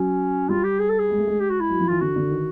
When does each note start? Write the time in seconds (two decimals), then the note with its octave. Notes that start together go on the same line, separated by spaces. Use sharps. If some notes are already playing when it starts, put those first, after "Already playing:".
Already playing: F#3 C#4
0.49 G3 F4
0.64 G4
0.79 G#4
0.89 A4
0.99 G#4
1.10 G#3
1.18 A3
1.27 G#3
1.40 G4
1.50 F#4
1.60 E4
1.69 F#3
1.79 F3
1.89 E3 F4
2.01 D3 F#4
2.16 D3
2.30 D#3